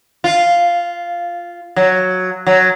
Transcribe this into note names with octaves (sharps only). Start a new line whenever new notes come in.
F4
F#3
F#3